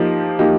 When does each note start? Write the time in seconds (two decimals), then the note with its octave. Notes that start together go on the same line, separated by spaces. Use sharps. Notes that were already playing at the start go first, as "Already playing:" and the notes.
Already playing: F3 A#3 D#4 G4
0.39 F3 A#3 D#4 G4